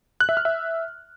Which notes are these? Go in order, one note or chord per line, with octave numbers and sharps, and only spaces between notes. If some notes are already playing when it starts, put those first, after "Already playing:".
F#6
E5
F6
E5